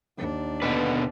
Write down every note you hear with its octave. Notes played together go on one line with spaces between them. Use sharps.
D#2 D4
B2 D3 B4